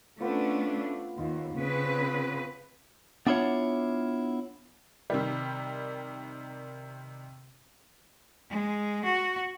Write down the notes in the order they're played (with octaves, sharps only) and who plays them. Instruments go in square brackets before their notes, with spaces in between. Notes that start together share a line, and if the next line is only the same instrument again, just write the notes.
[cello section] A3 C#4 D4 [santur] B3 F4 C5
[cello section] D#2 [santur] F4
[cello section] C#3 C4 B4
[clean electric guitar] B3 D4 E4 F4 C#5 F#5
[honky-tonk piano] C3 D#3 G3
[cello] G#3
F#4